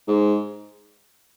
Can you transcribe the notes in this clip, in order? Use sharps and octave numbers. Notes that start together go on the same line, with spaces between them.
G#2